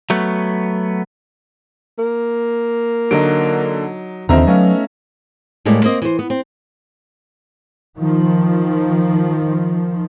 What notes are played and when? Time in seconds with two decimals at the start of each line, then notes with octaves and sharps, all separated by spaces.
0.10 F#3 A3 B3
1.99 A#3
3.11 D3 F#3 D#4 D7
4.29 D#2 D3 F3 C4 D#4 C5 E5 A#5
4.47 F#3 A3 B3 C#4 F5
5.65 A2 G3 G#3 A#3 E4 D5
5.84 A#3 C4 D#5
6.02 E3 C5
6.19 B3
6.30 C4
7.99 D#3 F3